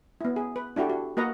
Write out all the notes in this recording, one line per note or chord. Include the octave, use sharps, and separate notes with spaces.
B3 E4
G#4
B4
D4 E4 F#4 G4 A4
F#4
A#3 F#4 B4 D#5 F#5 A#5